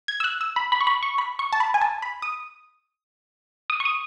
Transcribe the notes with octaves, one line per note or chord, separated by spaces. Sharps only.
G#6
E6
F#6
E6
B5
B5
C#6
B5
C#6
B5
C#6
A5
B5
G#5
A5
B5
D#6
D#6
C#6
D#6